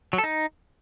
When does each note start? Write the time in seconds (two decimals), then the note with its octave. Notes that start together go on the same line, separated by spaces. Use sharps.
0.13 F#3
0.18 A4
0.24 D#4